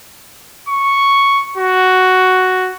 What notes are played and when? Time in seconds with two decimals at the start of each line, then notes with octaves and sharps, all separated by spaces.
0.69 C#6
1.58 F#4